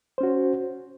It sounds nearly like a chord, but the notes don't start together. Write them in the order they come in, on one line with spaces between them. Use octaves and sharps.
C5 C#4 F#4